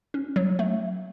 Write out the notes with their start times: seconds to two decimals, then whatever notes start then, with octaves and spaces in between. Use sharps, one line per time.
0.14 C#4
0.36 F#3
0.59 A3